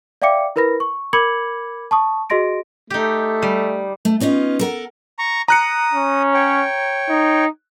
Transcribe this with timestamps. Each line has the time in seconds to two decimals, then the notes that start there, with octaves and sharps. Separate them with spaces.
0.22 D5 E5 F5 G5 D6 C#7
0.56 E4 A#4 B4 B5 A#6
0.80 C#6
1.13 A#4 B5 D6 G#6 C#7 F#7
1.91 A5 C#6 D#6
2.30 F#4 G#4 D#5 C6 A#6 D7
2.90 A3 D#4 G4
3.42 G3
4.05 A3
4.20 B3 C#4 D#4 F4
4.59 A4 A#4 F#5
5.19 A#5 C#6
5.48 A#5 D#6 F#6 C#7
5.93 C#4
6.34 C#5 G5
7.09 D#4